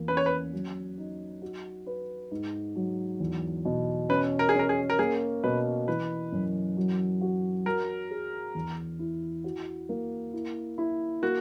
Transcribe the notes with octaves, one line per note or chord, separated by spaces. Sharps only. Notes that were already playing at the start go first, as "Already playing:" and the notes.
Already playing: E2 A#3
C#4 B4
C#5
B4
F#3
D#4
F#4
B4
G#2
F#3
E2
B2
C#4 B4
A#4
G#4
C#4
A#4
G#4
A#4
A#3 G#4
B2 B4
E3 B4
F#2
F#3
F#4
F#3 A#4
G#4
E2
E4
F#4
A#3
E4
E4
A#3 F#4